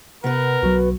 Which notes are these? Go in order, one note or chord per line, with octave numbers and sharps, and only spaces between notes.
C3 B3 A#4 B4
B1 F#3 F#4